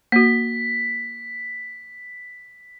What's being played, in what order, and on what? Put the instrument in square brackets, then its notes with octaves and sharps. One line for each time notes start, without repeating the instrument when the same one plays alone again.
[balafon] A#3 F#4 [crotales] B6